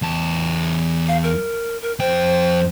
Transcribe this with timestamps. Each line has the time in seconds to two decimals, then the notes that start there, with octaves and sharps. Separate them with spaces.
0.02 E2 A5
1.08 F5
1.23 A#4
1.82 A#4
1.99 F2 C5 G5